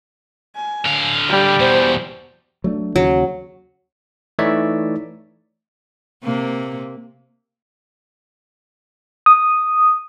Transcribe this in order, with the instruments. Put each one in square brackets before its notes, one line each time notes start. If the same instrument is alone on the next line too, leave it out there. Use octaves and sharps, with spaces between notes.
[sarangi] G#5
[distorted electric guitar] D3 F5
[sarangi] G3
[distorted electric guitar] E2 B2 [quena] C5
[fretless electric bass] F#3 A3 D4
[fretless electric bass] D#2 C#3 [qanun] F#3
[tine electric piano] E3 A3 D#4 C#5 D5 E5
[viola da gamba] C3 A#3
[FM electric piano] D#6